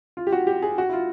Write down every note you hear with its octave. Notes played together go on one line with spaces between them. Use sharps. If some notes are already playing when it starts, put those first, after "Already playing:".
F4
G4
F#4
G4
G#4
F#4
E4
F4